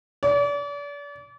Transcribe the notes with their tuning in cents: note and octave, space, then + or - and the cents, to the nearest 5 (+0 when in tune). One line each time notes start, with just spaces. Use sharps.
D5 -40